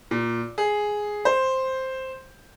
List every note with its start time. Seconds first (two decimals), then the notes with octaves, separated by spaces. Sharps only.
0.11 A#2
0.58 G#4
1.25 C5